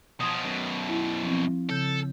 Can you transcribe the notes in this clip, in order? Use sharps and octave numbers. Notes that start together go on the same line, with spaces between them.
B2 F3 D#6 G#6
F#2 B2
E4
F3 C4
C#3 A4 G6